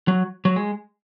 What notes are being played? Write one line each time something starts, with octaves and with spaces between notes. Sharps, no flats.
F#3
F#3
G#3